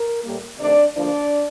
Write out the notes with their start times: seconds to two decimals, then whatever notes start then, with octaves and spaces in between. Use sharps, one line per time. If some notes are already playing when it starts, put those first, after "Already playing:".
Already playing: A#4
0.24 A2 G3 A#3
0.59 C3 D#3 A3 D4 D5
0.95 D2 D3 F3 A#3 D4 D5